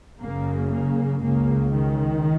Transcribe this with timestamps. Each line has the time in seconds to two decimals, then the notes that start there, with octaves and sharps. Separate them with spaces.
0.20 F#1 F#2 C#3 A#3
0.71 A#3
1.22 C#2 C#3 A#3
1.73 D#3